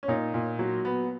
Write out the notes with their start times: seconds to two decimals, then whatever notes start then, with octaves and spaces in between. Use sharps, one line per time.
0.03 C#4
0.08 A#2 D#4
0.34 A#2
0.59 F#3
0.85 B3